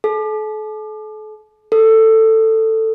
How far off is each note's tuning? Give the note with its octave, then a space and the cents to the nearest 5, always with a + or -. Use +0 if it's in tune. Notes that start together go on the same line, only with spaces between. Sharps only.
A4 -40
A4 +15